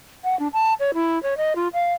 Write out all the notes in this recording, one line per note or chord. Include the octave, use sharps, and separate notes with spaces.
F#5
D4
A5
C#5
E4
C#5
D#5
F4
F5